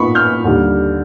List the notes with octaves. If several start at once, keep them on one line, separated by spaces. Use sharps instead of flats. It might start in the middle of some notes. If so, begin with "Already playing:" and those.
Already playing: A#2 B3 D#4 B5 C#6
F6 G6
D#2 D3 G3